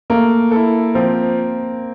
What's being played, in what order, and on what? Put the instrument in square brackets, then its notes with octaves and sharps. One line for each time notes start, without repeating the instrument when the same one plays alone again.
[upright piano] A3 [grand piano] A#3
[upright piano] E4 A4
[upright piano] F3 [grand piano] C4